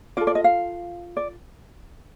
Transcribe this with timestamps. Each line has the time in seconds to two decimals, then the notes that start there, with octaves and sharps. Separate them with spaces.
0.17 F4 A4 D5
0.27 D5
0.35 D#5
0.44 F5
1.17 D5